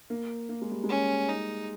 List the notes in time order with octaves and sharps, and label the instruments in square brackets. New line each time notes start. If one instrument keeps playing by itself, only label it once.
[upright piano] A#3
A#3
G#3
G3
G#3
[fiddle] C#4
D#4